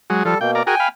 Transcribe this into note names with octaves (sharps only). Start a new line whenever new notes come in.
F#3 G#3
F3 G3 A4
B2 A#3 G5
A#4 D5
F#4 G#4 A#4 G5 G#5
F5 B5